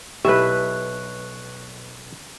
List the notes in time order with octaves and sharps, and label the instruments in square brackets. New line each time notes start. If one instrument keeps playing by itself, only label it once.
[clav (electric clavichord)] B1 E5 [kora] E4 B4 [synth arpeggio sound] G4 [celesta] C#6 F#6